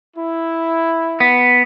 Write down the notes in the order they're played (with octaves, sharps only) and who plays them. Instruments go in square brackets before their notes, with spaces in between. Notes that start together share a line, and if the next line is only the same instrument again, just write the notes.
[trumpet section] E4
[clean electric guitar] B3